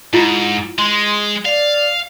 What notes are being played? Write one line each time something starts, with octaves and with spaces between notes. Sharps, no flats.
G#2 E4 F4 A#5
G#3 C6
D5 F5